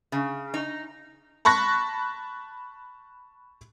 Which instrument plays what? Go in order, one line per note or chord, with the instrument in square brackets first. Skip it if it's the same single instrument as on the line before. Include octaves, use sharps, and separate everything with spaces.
[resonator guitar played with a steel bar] C#3
D#4
[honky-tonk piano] A5 B5 C#6 F#6 A#6